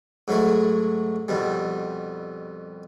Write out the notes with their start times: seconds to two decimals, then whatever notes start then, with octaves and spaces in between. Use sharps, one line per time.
0.28 G#2 F#3 A3 E4
1.28 C2 F2 B2 G3